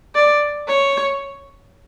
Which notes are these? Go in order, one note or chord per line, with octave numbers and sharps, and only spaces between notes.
D5
C#5